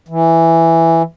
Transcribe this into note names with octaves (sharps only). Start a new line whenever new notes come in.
E3